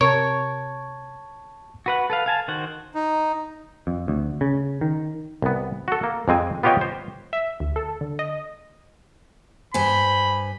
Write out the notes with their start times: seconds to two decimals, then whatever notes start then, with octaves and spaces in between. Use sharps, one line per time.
0.01 C3 A#4 C#5 A5 C#6 G#6
1.86 F#4 B4 F#5
2.10 A4 B4 F5
2.26 F5 G#5 A5
2.48 D#3 F#4 C5 F#5
2.95 D#4
3.87 F2
4.08 D2
4.41 C#3
4.81 D#3
5.42 C2 B3
5.88 F#4 A4
6.03 A#3
6.28 F2 G#3 C4 G#5
6.63 B3 F4 G4 C#5 D#5 G5
6.81 C5
7.33 E5
7.60 D2
7.76 A4
8.01 D3
8.19 D#5
9.74 G2 C5 G#5 B5